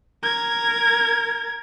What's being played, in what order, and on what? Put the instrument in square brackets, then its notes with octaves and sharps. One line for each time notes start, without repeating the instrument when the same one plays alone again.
[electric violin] A#4 G#6